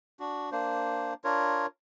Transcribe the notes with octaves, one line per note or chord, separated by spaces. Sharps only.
D4 F#4
A#3 D4 C5
D4 F4 A#4 C#5